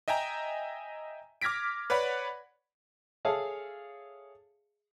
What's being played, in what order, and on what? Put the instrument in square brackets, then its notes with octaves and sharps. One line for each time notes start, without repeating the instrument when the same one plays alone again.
[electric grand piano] D#5 E5 G5 G#5 A#5
D6 F6 G#6 A#6 B6 D7
B4 C#5 D5 F#5 B5
[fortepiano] G#4 A4 C#5 E5 F5 A5